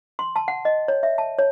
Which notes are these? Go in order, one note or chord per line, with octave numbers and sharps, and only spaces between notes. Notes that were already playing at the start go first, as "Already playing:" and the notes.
C6
A5
F#5
D#5
C#5
E5
A5
C#5